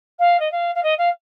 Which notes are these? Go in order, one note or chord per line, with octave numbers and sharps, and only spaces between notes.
F5
D#5
F5
F5
D#5
F5